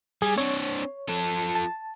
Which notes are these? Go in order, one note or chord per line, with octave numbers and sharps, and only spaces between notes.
G3 G#4 G#5
C4 D4 C#5
F3 A4
A5